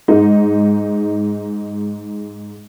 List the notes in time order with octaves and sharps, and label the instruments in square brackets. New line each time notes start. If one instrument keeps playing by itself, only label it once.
[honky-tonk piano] G#2 G#3 D#4